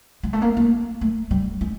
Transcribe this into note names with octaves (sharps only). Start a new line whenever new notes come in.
G#3
A3
A#3
A#3
A3
G3
G#3